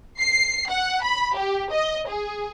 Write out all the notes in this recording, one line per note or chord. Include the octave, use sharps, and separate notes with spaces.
C7
F#5
B5
G4
D#5
G#4